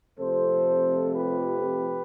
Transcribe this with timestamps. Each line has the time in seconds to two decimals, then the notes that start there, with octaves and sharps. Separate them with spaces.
0.19 F2 C3 F3 A3 A4 C5
1.15 G4 B4